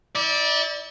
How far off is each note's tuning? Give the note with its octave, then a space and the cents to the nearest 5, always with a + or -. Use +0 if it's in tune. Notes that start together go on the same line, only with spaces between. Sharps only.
E4 -40 D5 +0